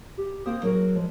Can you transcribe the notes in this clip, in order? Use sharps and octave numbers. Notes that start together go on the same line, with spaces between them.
G4
A#3 C4 C5 D#6
F#3 F#4 G#4 A#4
F3 G#3